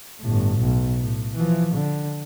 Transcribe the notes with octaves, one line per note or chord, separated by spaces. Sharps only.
G1 A2
B1
A2
E3 F3
D3